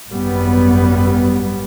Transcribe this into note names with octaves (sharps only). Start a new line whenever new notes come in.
G#1 F#2 G3 B3